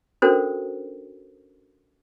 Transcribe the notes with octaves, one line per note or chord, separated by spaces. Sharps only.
C#4 D4 F#4 A4 A#4 C5